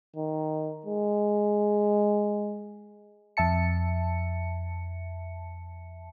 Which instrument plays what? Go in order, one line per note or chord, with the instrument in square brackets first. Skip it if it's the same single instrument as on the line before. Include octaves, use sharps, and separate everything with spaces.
[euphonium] D#3
G#3
[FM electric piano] F2 E5 A5 C#7